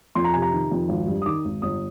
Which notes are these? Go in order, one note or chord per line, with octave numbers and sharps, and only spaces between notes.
F2 C6
A#5
C3 G#5
A#5
D#3
F2
G#1
G2
D#6
D#3 D6
G#1
G1 D#6